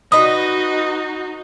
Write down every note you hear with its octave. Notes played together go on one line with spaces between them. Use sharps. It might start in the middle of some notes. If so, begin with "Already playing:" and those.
D#4 F#4 B4 D#5 D#6